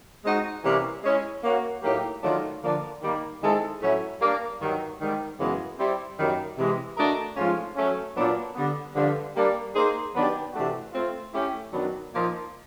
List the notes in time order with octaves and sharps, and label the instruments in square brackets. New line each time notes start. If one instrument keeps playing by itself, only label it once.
[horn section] G#3 C4 D#4 F#4
C3 E3 G3 A#3 C#4
G#3 C#4 E4
A#3 C#4 F#4
A2 F#3 A#3 D#4 G4
D#3 F#3 A3 D4 F4
D3 F3 A#3 D4 F4
D#3 G3 A#3
D#3 G#3 C4 E4 A4
A2 F#3 A3 C#4 E4
G3 A#3 D4
G2 D#3 F#3
G#2 D#3 G3
F#2 C#3 E3 G#3 B3
G3 C4 E4
F#2 D#3 G3 A#3
C3 E3 G#3
A3 D4 F#4 A#4 D#5
G#2 F3 A3 C#4 F4
F#3 A3 C#4
A#2 F#3 B3 D4
D3 G3 B3
G2 D3 F3
G3 A#3 D4
A#3 D#4 G#4 C5
D#3 F#3 B3 D4 G4
C3 E3 A3 D4 F#4
A3 C4 F4
A3 C#4 E4 G4
F#2 D#3 F#3 B3 D4
A#2 F3 A#3 D#4